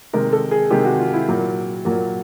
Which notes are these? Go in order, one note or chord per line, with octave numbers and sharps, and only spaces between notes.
C3 D#3 G#3 A#4
A4
G#4
C3 D#3 G#3 G4
F#4
F4
E4
A#2 F#3 A#3
A#2 F#3 A#3